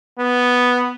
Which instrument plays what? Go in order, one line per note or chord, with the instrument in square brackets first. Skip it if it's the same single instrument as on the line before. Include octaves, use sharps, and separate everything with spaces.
[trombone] B3